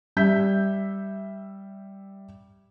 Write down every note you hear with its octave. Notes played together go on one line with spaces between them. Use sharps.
G3 E5 G6 B6